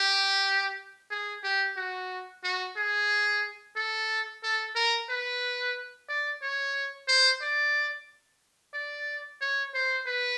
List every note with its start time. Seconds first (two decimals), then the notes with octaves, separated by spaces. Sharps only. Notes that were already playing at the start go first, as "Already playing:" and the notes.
Already playing: G4
1.11 G#4
1.44 G4
1.77 F#4
2.44 F#4
2.77 G#4
3.76 A4
4.43 A4
4.76 A#4
5.10 B4
6.09 D5
6.42 C#5
7.08 C5
7.42 D5
8.74 D5
9.41 C#5
9.74 C5
10.07 B4